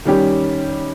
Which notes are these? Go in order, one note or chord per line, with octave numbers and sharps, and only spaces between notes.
D#3 G3 C#4 G4